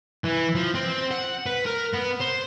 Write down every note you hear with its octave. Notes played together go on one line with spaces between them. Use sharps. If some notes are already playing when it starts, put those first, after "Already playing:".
E3
F3
C4
F#5
B4
A#4
B3
C5